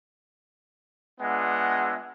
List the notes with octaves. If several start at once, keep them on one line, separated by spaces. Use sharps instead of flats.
G#3 B3 D4 F4 E5 F#5